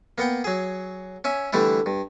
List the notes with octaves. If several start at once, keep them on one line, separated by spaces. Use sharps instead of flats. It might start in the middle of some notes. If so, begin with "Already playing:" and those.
A#3 B3 F#5 G5
F#3 G#4
C#4 E5 G#5
D3 E3 G3 A3 D4 E4
G2